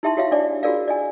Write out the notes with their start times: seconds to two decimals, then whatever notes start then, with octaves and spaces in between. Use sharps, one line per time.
0.03 D#4 E4 G4 E5 A5 C6
0.17 F#4 G4 C#5 E5 F5
0.31 D4 C#5 D5 D6
0.63 F4 F#4 G#4 A#4 D5 F5
0.88 D5 D#5 G#5